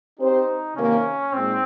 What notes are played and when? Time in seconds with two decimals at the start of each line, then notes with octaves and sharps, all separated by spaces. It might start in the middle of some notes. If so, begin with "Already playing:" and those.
0.19 C4 D#4 G4 C5
0.75 C3 D#3 A#3 C#4
1.33 A#2 G#3 C4 D#4